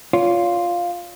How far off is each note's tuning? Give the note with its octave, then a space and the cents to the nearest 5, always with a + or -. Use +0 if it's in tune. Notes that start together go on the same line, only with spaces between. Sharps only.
F4 +0 C#5 +40